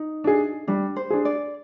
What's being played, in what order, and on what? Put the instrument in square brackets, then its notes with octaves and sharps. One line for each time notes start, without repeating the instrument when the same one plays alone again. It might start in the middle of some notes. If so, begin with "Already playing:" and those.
Already playing: [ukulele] D#4
[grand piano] D4 G#4
[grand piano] G3 [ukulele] D4
[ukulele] C5
[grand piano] D4 G#4
[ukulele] D5